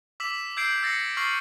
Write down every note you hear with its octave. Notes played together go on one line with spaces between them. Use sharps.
D6 E6 B6 E7 F#7
E6 G6 G#6 C7 D7 F#7
E6 A6 A#6 C7 C#7
C#6 E6 F6 A6 C7 F#7